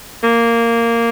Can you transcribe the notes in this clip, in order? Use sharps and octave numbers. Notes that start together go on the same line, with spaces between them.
A#3